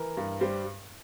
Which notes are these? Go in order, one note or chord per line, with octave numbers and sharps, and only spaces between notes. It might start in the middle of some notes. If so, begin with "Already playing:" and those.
Already playing: E3 A#4
G2
G3 C5